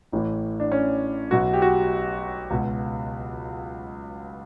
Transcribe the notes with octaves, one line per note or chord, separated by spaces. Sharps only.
A1 A2 E3
D4
C#4
B1 B2 F#4
G4
F#4
C#2 B2